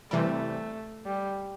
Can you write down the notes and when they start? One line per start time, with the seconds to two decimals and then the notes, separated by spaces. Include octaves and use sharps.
0.11 C3 E3 G3 A3
1.06 G3